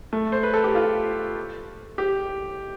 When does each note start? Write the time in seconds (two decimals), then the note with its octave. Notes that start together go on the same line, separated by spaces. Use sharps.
0.13 A3
0.32 C5
0.43 B4
0.53 A4
0.64 G4
0.75 F4
1.98 G4